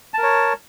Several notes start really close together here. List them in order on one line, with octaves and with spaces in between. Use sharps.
A5 A#4 C#5